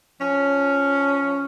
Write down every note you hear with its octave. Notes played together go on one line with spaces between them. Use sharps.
F3 C#4